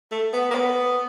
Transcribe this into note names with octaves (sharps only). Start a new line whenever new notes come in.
A3
B3
A#3
B3